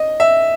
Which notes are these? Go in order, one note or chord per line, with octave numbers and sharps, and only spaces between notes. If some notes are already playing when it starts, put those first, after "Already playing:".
Already playing: D#5
E5